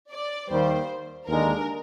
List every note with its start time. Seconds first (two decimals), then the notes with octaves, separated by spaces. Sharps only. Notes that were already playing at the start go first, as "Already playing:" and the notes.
0.12 D5
0.50 D#2 D#3 G3 A#3 C5
1.27 D#2 D3 G#3 D4 A#4